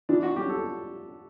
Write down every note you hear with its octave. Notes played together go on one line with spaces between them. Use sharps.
E3 D4
F#4
G3 C#4 G4
A4